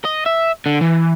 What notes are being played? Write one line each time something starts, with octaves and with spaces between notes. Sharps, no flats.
D#5
E5
D3
E3